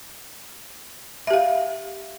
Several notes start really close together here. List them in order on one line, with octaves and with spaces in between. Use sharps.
E5 G4 F5